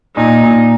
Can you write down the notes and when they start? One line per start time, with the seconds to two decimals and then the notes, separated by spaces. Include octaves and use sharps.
0.16 A#2 D#4
0.43 A#2